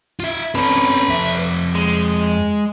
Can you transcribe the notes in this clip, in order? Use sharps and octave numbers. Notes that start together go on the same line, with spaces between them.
F4 E5
C4 C#4 A4 B4
F2 E5
G#3